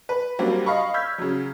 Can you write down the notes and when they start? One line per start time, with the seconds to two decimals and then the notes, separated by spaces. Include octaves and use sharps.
0.09 B4
0.39 F#3 G3 A#3 C4 D4
0.66 D#5 F5 B5 C#6
0.94 E6 F6 G6 G#6 B6
1.18 C#3 F#3